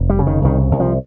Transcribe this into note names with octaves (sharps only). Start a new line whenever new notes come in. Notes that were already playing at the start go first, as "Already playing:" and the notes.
Already playing: F1
G3
C#3
D#3
C2 D#3
C2
F3